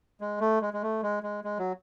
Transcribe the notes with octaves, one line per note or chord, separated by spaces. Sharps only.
G#3
A3
G#3
G#3
A3
G#3
G#3
G#3
F#3